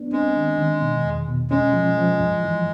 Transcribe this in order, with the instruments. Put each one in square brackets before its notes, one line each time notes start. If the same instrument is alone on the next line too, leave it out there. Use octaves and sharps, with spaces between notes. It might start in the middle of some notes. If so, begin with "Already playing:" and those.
Already playing: [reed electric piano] B3 D4
[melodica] G#3 [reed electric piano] C4
[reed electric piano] D#3
D#3
B2
E2
B2
[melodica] G#3 [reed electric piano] C#4
[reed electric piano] F3
F3
G2
E3